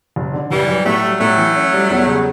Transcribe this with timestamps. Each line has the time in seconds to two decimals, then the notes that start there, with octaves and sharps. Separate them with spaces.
0.16 F#1
0.34 D3
0.51 F#1 E3 G3
0.68 F#2
0.85 A2 F#3 A3
1.03 G3
1.20 A2 F#3 A3
1.38 E3
1.56 C#4
1.73 G3
1.90 E2
2.07 C#3